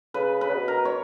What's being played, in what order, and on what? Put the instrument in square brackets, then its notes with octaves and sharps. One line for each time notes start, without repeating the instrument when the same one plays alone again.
[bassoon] C#3 [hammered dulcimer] B4
[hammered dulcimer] B4
[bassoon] C#3
B2
[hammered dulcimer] A#4
C#5